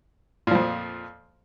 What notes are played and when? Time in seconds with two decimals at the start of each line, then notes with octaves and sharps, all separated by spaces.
0.47 A#2
0.51 F3
0.55 F2